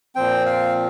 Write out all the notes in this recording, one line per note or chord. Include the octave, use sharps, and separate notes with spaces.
A#2 F3 C4 G5
F5